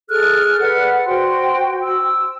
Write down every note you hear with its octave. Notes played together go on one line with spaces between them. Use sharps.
G#4 A4 F6 F#6
B4 D5 F#5
F#4 C5 G5 C6
E6